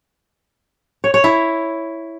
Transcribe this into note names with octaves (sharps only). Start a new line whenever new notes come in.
C#5
C#5
E4